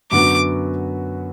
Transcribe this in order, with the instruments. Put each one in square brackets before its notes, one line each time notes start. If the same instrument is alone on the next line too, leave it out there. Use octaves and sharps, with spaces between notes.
[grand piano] F#2 D3 F#3 B3 F#4 [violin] D6